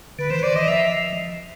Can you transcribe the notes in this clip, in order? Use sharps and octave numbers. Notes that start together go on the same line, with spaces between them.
D3 B4
E3 C5
D#3 D5
E3 D#5
F3 E5